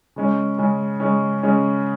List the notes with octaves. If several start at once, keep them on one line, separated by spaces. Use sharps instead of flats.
C#3 G#3 C#4
C#3 G#3 C#4
C#3 G#3 C#4
C#3 G#3 C#4